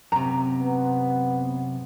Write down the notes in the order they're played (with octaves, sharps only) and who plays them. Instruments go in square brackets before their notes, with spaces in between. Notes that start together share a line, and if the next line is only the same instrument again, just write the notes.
[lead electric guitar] F#2 C3 [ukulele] A#5
[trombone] B3